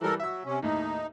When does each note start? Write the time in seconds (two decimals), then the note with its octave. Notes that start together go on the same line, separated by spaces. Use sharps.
0.01 E3 G3 A4 A#4
0.20 F#3 E5 E6
0.45 C3 C#4
0.62 D#2 A2 D#4